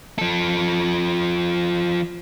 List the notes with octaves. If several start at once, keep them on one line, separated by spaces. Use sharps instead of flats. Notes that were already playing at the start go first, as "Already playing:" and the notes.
F3 A4